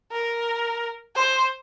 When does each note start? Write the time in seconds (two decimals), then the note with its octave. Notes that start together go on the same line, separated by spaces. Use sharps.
0.12 A#4
1.15 C5